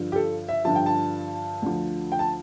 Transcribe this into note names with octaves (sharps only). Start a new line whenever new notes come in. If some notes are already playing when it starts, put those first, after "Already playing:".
Already playing: G2 D3 F3
G4
A4
E5
G2 D3 F3 A5
G5
A5
D2 D3 F3
G5
A5